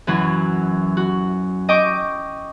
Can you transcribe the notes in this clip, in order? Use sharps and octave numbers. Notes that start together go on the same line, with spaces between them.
F#2 E3 F#3
F#4
D#5 G5 C#6 D6